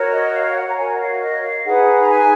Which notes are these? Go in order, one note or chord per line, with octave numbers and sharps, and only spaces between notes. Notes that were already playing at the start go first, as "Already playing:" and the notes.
Already playing: F#4 A#4 C#5
D#5
F5
F5
F#5
A#5
F#4 A#4 C#5 G#5
D#5
F5
D#5
F5
D#4 G#4 B4 F#5
A#5
G#5